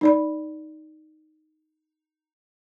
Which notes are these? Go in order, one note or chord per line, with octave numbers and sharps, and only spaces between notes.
D#4 D5 B5